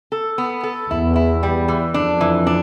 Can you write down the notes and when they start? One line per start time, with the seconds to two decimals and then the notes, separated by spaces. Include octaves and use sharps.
0.12 A4
0.38 B3
0.63 A4
0.90 E2 E4
1.16 E4
1.43 G3
1.68 E3
1.94 F2 D4
2.21 E3
2.47 D4